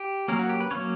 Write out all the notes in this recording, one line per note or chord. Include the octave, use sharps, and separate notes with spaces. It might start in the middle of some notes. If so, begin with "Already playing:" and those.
Already playing: G4
F#3 A#3 C#4 A#4
F#4
G4
B4
F#3 A#3 C#4 C#5